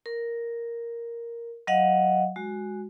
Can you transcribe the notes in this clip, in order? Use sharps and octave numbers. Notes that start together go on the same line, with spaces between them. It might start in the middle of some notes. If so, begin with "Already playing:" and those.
A#4
F#3 D#5 F5 F#5
G#3 F#4